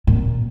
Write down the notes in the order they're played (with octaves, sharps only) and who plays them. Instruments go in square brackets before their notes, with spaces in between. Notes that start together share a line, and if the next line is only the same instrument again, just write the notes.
[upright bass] A#2